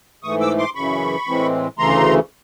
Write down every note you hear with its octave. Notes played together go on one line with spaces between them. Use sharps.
G#2 E3 A3 C#6 D#6
D6 E6
C6 D6
F#2 C#3 E3 B5 C#6
A2 E3 G#3 C4
D2 C#3 E3 A3 A#5 C6